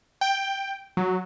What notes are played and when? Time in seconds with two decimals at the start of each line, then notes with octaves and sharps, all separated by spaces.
0.21 G5
0.97 F#3